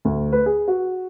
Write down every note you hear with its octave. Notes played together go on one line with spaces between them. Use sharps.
D2
B4
G#4
F#4